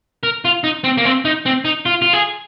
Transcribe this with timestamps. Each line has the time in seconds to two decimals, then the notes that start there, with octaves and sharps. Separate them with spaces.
0.23 A#4
0.45 F4
0.64 D#4
0.84 C4
0.97 A#3
1.05 C4
1.25 D#4
1.46 C4
1.65 D#4
1.86 F4
2.02 F4
2.13 G#4